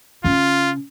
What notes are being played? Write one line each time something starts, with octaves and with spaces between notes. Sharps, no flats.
C#3 C#4 F4